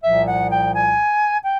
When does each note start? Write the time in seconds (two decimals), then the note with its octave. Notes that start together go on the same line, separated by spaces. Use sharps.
0.04 C2 A#2 F3 E5
0.26 F#5
0.50 G5
0.74 G#5
1.43 G5